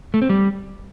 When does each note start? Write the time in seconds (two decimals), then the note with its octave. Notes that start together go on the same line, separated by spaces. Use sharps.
0.14 A3
0.22 C4
0.29 G3